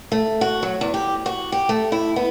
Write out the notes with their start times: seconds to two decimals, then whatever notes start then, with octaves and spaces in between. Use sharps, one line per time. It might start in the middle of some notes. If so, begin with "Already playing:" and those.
0.12 A3
0.41 F#4
0.63 F#3
0.81 E2
0.94 G4
1.26 F#4
1.52 G4
1.69 A3
1.92 E4
2.16 B3